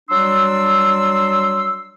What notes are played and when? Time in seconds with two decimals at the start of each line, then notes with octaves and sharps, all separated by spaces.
0.09 F#3 G3 D4 C6 E6